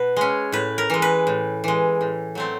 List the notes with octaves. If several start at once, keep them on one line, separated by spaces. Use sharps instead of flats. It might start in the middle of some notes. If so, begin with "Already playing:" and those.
Already playing: B2 B4
G#3 C#4
A2 B4
A#4
E3 G#3
B4
A2
E3 G#3
A2
F#3 A3 C4